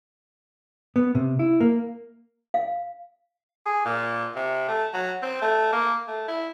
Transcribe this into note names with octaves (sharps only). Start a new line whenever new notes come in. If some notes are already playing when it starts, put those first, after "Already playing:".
B3
C3
E4
A#3
F5
G#4
A#2
C3
A3
F#3
C4
A3
A#3
A3
E4